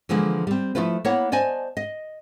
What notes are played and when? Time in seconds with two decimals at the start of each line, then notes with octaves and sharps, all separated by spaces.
0.09 D3 E3 F3 G#3 A#3
0.47 G3 C4
0.75 F3 A3 E4 F4 B4
1.05 A#3 B3 E4 C#5 F#5
1.32 C5 D5 D#5 G#5 A5
1.77 D#5